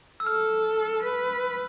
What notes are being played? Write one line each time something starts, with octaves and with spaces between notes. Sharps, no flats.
E6
A4 F6
B4